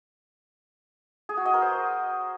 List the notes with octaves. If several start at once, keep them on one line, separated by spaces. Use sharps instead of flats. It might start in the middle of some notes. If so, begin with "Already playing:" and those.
G#4
F#4
D#5
A#4
C5